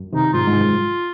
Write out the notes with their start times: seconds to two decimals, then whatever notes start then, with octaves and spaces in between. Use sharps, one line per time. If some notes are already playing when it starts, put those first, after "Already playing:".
Already playing: F#2
0.13 C3 D#3 D#4
0.33 G#2 F4
0.48 G#2
0.61 F#2